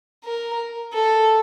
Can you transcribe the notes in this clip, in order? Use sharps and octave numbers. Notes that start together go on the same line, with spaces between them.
A#4
A4